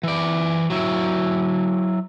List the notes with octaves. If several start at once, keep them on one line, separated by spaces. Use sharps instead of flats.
E3 D5
F#3 E4